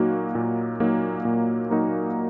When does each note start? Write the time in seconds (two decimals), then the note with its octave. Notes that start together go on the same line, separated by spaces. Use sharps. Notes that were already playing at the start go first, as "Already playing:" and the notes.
Already playing: A#2 F#3 A#3 D#4 F#4
0.35 A#2
0.80 F#3 A#3 D#4 F#4
1.25 A#2
1.70 F#3 A#3 D#4 F#4